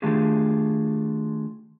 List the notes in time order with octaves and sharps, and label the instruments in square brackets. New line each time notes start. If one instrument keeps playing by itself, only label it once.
[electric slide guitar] D#3 A3 D4 F4 G4 G#4